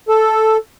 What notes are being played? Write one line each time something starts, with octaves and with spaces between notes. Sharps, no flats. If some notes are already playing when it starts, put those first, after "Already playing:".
A4